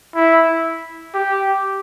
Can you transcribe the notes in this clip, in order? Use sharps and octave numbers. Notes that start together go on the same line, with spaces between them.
E4
G4